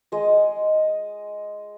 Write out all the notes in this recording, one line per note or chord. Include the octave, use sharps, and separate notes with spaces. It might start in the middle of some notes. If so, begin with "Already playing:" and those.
G#3 D#5